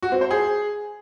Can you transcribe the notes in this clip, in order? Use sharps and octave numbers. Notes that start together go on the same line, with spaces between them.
F#4
C4
C5
G#4